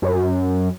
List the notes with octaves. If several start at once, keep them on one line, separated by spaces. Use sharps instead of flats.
F#2